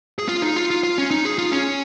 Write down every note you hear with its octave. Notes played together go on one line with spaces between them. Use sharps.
G#4
F4
D#4
F4
F4
F4
C#4
D#4
G#4
F4
C#4